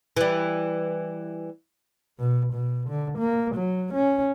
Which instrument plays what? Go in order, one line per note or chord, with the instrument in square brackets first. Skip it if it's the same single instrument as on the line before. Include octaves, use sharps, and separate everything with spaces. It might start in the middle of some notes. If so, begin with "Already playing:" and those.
[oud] E3 G3
[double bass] B2
B2
D3
A#3
F#3
C#4